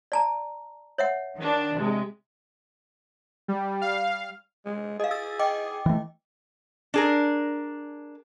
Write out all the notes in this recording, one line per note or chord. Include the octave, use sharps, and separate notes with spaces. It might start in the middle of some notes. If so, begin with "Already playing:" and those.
D5 A5 A#5
C#5 E5 F#5
D#3 D4
C3 G#3
G3
F5
G#3
G#4 D#5 F5
G#4 E6 A6
D#5 G5 D6
E3 A3
D4 G#4 A#4